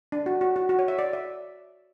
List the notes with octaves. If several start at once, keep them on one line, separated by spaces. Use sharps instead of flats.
D4
F#4
F#4
F#4
F#4
C#5
E5
D5
E5